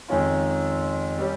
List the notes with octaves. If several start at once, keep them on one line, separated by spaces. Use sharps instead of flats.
F2 D#3 G#3 C#4 F4
G3 C#4 G4